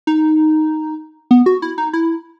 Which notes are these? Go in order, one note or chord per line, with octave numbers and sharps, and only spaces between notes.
D#4
B3
F#4
E4
D#4
E4